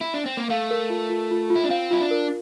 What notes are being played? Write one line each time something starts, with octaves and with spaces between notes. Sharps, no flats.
E4
D4
C4
A#3
A3 F5
A#4
F4
F4
F4
F4
E4
D4
C4 F5
E4 F4
D4
A#4